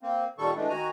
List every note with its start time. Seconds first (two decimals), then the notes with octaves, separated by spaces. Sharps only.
0.03 A#3 C4
0.38 A#2 D#3 G3 A4 C#6
0.56 E3 G#3 A3 D4
0.69 D#3 F#4 G#5 A#5